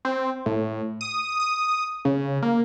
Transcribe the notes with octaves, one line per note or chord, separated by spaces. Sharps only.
C4
A2
D#6
D#6
C#3
A#3